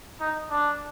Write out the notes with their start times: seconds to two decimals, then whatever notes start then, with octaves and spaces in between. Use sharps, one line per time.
0.20 D#4
0.51 D4